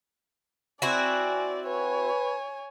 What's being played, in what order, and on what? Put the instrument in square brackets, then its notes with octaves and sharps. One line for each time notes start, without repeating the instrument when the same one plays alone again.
[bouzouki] C4 E4 F#4 [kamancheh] D5 [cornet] G#5
[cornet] B4 [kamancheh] C#5 G#5